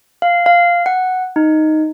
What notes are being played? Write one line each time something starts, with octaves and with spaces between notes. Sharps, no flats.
F5
F5
F#5
D#4